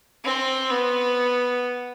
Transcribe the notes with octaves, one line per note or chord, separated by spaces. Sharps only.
C4
B3